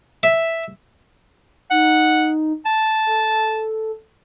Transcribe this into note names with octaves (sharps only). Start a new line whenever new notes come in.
E5
D#4 F#5
A5
A4